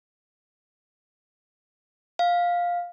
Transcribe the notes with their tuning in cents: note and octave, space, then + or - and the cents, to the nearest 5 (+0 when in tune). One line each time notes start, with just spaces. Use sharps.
F5 +10